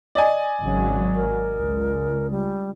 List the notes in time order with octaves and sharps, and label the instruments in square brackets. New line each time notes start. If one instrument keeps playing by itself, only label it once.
[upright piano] D5 D#5 G#5
[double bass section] G#1 F#3 [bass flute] C#3
[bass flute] A#4
[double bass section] C#2
[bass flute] G3